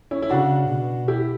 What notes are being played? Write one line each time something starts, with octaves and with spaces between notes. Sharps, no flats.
C#4 E4
E4
C#3 D4 F#4
B2
E4 G4